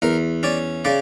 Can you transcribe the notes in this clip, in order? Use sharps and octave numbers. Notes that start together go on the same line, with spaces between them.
E2 A#4
C#4 D5
C#3 D5